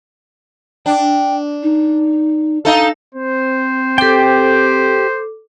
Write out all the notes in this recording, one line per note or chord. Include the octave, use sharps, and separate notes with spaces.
D4 G5
D#4
D#4 A4 F5
C4 C5
G4 A4 G5 D6